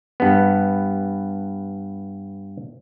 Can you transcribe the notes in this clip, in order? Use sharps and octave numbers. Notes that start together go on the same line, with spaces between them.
G2 B3